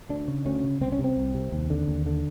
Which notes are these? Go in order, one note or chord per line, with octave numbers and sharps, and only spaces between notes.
D2 D4
C#3
D2 C#4
C#3
C2 C4
C#4
C3
C4
C2
C3
D#2
D3
D#2
D3